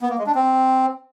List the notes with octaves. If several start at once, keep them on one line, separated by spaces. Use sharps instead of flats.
B3
A#3
G#3
D4
C4